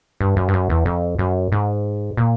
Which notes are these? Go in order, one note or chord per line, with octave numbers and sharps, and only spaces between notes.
G2
F#2
G2
F#2
E2
F2
F#2
G#2
A#2